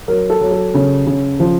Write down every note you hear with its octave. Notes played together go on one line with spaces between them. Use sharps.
F#3 A#4
A4
F#3
A4
C#3
C#3
F3